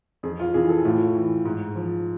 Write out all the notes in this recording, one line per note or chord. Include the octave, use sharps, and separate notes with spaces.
F2 G#4
F4
C3 E3 G#4
A4
A2 F4
E3
G#2
F3